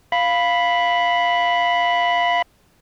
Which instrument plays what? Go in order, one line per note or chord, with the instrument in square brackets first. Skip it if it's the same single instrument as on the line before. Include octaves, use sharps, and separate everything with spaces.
[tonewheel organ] F5 B5